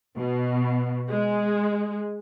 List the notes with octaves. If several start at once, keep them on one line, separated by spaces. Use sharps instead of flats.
B2
G#3